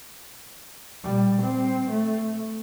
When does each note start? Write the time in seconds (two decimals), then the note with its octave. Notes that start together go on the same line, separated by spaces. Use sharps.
1.04 A#2 G3
1.42 C4
1.91 A3